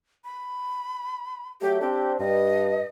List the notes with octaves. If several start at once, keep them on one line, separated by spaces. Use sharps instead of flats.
B5
F#3 A3 G4
C4 D4 G4
G2 D#5